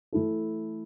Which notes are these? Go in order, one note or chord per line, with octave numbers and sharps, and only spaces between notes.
E3 A3 E4 A4